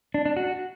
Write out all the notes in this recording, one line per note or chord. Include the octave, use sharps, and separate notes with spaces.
D4
D4
F#4